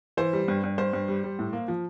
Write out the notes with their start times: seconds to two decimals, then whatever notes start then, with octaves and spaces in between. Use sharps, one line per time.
0.17 E3 C5
0.33 G3
0.48 G2
0.63 G2
0.78 G2 C5
0.93 G2
1.08 G3
1.24 G3
1.39 A2
1.53 A#3
1.68 F3